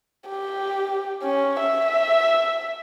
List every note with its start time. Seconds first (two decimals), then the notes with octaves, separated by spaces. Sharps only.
0.29 G4
1.23 C#4
1.60 E5